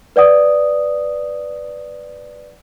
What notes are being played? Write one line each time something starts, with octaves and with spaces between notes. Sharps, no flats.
B4 D5 F#5 D#6